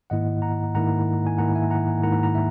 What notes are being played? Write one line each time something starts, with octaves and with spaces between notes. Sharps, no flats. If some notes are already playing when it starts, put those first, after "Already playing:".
G#2 D#3 A#3 E4 D#5 F#5
F#5 A#5
G#2 D#3 A#3 E4 F#5 A#5
G#5
G#2 D#3 A#3 E4 F#5 A#5
E5 G#5
F#5 A#5
G#2 D#3 A#3 E4 F#5 A#5
A#5
E5